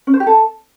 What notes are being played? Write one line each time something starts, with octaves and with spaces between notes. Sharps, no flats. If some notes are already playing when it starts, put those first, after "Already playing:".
C#4
C5
G4
A4